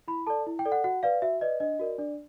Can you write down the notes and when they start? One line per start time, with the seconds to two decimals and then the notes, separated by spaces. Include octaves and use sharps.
0.08 E4 B5
0.27 A4 D5 A5
0.47 E4
0.59 G5
0.65 A4 D5
0.72 F#5
0.84 F#4 F#5
1.03 B4 D5 F5
1.22 F#4 E5
1.41 B4 D5 D#5
1.60 D4 D#5
1.79 F#4 A#4 D5
1.98 D4 D5